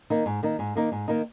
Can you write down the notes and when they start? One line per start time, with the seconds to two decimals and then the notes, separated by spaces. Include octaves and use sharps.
0.10 D#3 A#3 D#4
0.26 G#2
0.43 D#3 A#3 D#4
0.59 G#2
0.76 D#3 A#3 D#4
0.92 G#2
1.08 D#3 A#3 D#4